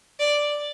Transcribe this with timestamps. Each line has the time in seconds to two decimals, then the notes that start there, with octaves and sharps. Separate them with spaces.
0.20 D5